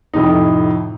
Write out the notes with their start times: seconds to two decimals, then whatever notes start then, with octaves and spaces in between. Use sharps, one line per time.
0.14 F2 A2 C3 D#4